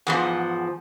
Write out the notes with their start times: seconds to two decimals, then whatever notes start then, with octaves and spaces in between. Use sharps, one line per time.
0.07 E2 G#2 F3 F#5